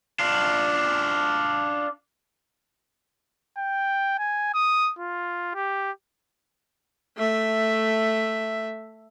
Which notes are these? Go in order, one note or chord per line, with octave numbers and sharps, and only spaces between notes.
D4 F4
G5
G#5
D#6
F4
G4
A3 E5